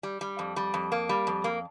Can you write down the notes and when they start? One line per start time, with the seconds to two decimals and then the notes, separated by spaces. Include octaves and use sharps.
0.03 G3
0.21 G3
0.39 F2
0.56 G3
0.74 F2
0.92 A#3
1.09 G3
1.27 F2
1.44 A#3